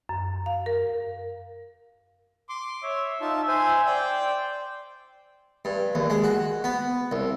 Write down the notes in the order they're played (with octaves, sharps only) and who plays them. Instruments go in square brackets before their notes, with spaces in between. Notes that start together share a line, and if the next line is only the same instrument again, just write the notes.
[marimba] F#2
F5
A#4
[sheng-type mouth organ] C6 D6
[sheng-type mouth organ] C#5 [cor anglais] E5
[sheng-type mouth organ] D#4 F4 A5
C5 G#5
[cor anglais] C5 [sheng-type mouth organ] D5 G5
[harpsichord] G2
D#2
G#3
F#4
B3
C2